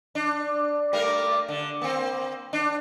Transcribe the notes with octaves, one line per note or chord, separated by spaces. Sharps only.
D4
G3 A3 A#4
D3
A#3 C4
D4